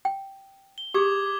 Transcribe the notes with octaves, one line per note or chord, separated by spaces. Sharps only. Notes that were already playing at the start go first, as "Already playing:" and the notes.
G5
G7
G4 G#4 D6 D#6 G#6
D6